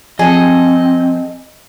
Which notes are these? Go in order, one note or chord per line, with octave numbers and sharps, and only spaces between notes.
F3 C4 G#4 A4 D#5 D#6